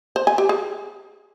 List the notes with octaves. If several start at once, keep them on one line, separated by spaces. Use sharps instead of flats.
C5
G#5
G4
G#4